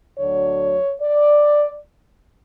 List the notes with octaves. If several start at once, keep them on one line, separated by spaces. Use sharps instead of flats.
D2 D3 F#3 C#5
D5